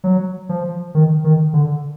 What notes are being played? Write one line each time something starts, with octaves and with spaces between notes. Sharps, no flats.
F#3
F3
D#3
D#3
D3